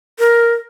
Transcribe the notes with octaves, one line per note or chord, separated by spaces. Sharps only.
A#4